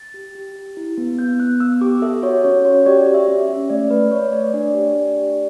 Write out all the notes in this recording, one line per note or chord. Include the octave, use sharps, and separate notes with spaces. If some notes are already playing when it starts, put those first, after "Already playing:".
Already playing: A6
G4
G4
G4
E4
B3
B3 G6
B3 F#6
B3 E6
G4 D6
A4 E5
F#4 C#5
C#4 C#5
F#4 C#5
G4 D5
G4
E5
C#4
E5
C#4
A3 D5
A3 B4
A3 C#5
A3 D5
D4 D5
G4
D4 D5
G4